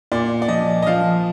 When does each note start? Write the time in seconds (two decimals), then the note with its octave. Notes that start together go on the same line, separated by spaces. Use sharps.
0.12 A#2 D5
0.42 D5
0.48 F3 D#5
0.82 D#5
0.86 F3 F5